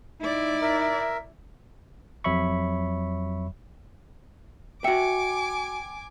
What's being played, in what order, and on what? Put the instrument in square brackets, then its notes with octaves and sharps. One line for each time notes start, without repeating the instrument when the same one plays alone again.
[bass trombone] D#4 [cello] E4 D5
[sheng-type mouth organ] A#4 E5
[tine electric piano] F2 F#3 C#5 E5 B5 C#6
[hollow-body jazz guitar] F#4 E5 [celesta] G5 C#7 [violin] G#5 D6